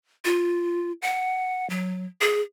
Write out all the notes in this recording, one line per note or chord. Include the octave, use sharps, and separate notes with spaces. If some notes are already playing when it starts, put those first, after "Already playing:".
F4
F#5
F#3
G#4